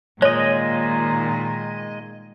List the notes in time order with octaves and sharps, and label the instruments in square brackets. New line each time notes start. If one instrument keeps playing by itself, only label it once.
[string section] A#2 D#3 [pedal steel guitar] G#3 D#5 [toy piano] C#5